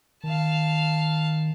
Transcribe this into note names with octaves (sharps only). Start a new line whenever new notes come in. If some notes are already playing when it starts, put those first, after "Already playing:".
D#3 F5 A5